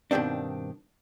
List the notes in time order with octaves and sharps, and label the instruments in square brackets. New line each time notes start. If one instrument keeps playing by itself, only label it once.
[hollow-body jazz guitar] G2 B2 D#3 C4 D4